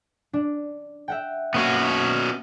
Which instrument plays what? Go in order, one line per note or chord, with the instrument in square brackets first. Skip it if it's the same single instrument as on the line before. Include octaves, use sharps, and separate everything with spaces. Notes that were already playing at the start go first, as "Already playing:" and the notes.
[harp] D4
E5 F#5 G5
[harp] A#3 C#6 C7 [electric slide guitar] B3 C#4 F#4